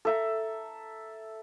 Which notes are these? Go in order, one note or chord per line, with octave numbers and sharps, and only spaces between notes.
A4 E5 A#5